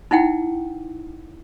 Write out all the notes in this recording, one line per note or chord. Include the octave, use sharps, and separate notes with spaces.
D#4 E4 F#5 G5